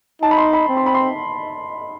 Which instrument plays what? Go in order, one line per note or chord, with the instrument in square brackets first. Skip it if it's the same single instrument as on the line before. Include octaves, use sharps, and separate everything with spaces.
[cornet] D#4 [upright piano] A5
[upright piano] B5
C6
B5
[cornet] C4
[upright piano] C6
B5
C6